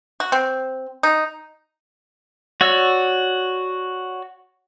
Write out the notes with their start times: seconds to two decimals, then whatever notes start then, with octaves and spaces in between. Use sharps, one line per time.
0.20 F#4
0.32 C4
1.03 D#4
2.61 F#4 C#5 D5 E6